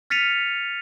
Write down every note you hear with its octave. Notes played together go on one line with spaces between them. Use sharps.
F6 A6 B6 C#7 D#7 F7